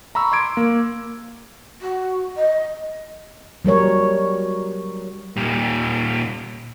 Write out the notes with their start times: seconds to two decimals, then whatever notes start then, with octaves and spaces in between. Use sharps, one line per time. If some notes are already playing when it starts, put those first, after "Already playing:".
0.15 A#5 B5 C#6 E6
0.32 C6 D6 G#6 D7
0.57 A#3
1.81 F#4
2.37 D#5
3.65 F#3 G3 A#4 C#5
5.37 A#2 G3